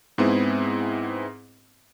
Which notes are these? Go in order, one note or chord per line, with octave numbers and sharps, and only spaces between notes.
G#2 B3 C4 E4 G#4